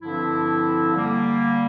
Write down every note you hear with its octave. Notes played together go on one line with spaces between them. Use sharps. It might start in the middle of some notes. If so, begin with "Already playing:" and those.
G2 D3 F3 C4 E4
D3 G3 A#3